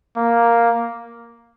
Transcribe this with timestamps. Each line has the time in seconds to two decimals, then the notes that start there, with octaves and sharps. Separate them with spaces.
0.16 A#3